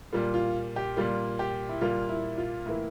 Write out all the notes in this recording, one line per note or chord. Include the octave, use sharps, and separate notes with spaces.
A#2 G3 A#3 F4
F4
G4
A#2 G3 A#3 F4
G4
E4
A#2 G3 A#3 F4
E4
F4
A2 E3 A#3 E4